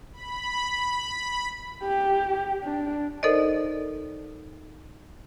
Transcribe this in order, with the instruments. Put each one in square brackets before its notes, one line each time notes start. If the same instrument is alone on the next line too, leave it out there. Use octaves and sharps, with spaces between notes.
[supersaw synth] B5
[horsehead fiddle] G4
D4
[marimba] D#4 A4 A#4 C5 D5 D#5